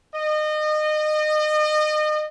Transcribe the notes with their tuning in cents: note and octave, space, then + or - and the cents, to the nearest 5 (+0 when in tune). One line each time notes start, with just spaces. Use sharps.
D#5 -30